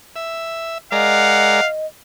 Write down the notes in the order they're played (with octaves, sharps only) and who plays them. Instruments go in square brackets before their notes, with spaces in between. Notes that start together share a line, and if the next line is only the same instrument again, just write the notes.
[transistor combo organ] E5
[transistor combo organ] G#3 A#4 D5 [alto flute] D#5 [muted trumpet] F5 [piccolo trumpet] F#5